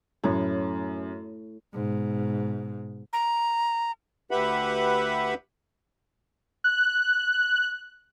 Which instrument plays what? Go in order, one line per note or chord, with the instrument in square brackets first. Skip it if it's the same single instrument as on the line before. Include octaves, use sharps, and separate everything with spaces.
[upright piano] F#2 [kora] A2 C#5
[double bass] G#2 B2
[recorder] A#5
[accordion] D2 G4 B4 E5 F#5 B5
[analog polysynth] F#6